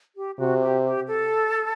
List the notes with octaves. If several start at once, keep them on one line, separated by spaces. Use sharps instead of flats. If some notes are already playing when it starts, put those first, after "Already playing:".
G4
C3 F#4
G4
G4
A4